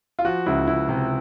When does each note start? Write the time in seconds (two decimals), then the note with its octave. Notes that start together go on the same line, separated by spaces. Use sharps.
0.19 F4
0.25 F3 F#4
0.46 C#2 E4
0.67 C#2 E4
0.89 C3